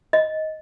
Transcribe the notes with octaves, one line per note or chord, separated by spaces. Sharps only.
D#5